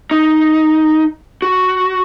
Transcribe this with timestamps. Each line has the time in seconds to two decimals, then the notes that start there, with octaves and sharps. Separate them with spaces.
0.11 D#4
1.42 F#4